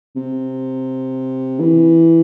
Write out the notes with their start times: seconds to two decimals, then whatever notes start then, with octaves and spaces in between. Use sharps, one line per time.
0.16 C3
1.59 E3